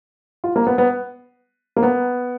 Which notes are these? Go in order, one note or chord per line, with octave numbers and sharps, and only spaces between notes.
F4
A#3
B3
B3
A#3
B3